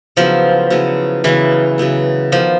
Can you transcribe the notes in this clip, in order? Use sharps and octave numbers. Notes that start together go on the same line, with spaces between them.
C#3 F3 F#3 B3 E4
C#3 F#3 B3 E4
C#3 E3 F#3 B3 E4
C#3 F#3 B3 E4
D#3 F3 F#3 B3